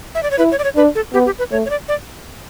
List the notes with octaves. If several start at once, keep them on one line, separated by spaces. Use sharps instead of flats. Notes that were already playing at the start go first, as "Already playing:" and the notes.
E5
D5
C#5
E4 B4
C#5
D5
C#5
D4 B4
A4
B3 G4
G4
B4
A3 C#5
C#5
D5
D5